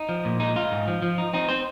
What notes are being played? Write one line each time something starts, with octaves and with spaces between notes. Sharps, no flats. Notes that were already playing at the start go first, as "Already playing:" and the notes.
Already playing: D#4
F3
A#2
G#3 D#4
D#4 F4
G#2
F3
F3
D#4
C4 D#4
C4 C5